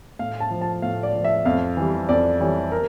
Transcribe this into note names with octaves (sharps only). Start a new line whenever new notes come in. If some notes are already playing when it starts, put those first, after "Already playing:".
A2 F5
A5
F3
A5
A2 F5
D5
F3
E5
F2 F5
E3 G3
F2 D5
E3 G3 C#5
A#4